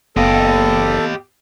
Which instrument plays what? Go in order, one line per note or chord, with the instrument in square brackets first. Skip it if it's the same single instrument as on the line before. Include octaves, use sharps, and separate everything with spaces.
[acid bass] F#1 [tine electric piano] B3 F5 [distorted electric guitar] G4 D#5 [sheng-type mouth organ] A4